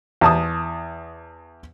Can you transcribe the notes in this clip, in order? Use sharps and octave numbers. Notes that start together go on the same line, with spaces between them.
E2 A5 D#6